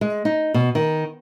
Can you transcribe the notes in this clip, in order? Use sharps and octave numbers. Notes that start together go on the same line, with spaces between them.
G#3
D#4
B2
D#3